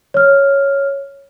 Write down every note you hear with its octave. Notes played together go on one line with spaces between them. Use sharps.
C#5 F6